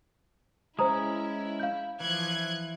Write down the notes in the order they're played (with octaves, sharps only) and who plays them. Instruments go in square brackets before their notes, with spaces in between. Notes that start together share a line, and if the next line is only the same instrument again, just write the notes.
[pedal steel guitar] G#3 C#4 [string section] E4 [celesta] C5 A#5 D#6
[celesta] F5 G6
[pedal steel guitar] E3 [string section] F3 F#6 G#6